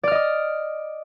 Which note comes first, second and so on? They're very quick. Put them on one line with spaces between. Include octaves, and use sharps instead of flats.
D5 F6 D#5 D#6